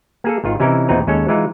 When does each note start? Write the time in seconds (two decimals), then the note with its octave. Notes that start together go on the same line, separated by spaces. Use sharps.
0.24 A#3 G#4 A4
0.44 G#1 D#3 F4
0.60 C3 E3 C#4 D#4 E4 A#4
0.88 E2 A#2 C4 D#4 B4 A#5
1.07 D#2 G#3 C#4 A4 C#5
1.29 E3 G#3 D#4 F4